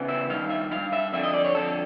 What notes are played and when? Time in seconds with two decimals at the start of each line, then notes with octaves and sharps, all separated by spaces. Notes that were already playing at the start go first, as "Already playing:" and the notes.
Already playing: E2 C#3 E3
0.08 E5
0.29 G2 D#3 F5
0.50 E5
0.71 G2 D#3 F5
0.93 E5
1.13 F2 D3 E5
1.23 D#5
1.34 D5
1.44 C#5
1.55 F2 D3 A4